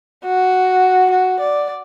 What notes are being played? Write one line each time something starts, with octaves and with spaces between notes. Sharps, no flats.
F#4
F#4
D5